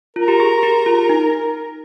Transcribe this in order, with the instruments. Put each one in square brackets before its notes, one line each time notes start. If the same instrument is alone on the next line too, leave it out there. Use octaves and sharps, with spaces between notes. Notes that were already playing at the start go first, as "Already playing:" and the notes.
[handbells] F4 [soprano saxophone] A#4
[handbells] G4
G#4
G4
F4
D#4